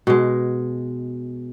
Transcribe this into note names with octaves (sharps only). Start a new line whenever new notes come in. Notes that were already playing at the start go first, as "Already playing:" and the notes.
B2 G#3